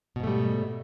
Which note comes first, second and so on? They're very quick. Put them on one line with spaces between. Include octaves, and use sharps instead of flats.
B2 G#2 A3 G3